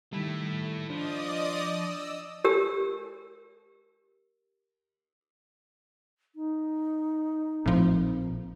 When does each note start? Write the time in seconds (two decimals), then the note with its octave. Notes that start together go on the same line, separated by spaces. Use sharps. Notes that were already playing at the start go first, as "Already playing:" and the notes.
0.13 D#3 G3 A3 E4
0.90 F3 D4 D5 D#5 D#6
1.72 E6
2.45 G4 A#4 E6
6.36 D#4
7.66 A#1 A2 F3 C4